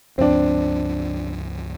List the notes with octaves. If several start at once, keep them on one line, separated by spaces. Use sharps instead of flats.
C#2 G2 F3 C4 D4